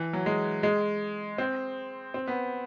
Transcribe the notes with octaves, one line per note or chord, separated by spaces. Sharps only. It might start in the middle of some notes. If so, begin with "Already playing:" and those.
Already playing: E3
F#3
G#3
G#3
C4
C4
B3